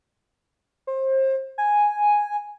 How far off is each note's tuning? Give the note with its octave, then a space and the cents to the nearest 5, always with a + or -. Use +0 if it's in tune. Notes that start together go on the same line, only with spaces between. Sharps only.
C5 +30
G#5 +0